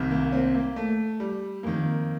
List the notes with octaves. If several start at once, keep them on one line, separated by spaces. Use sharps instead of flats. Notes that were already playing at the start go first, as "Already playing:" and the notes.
Already playing: C2 C3 D#3
A#3
C4
A#3
A3
G3
F2 D#3 A#3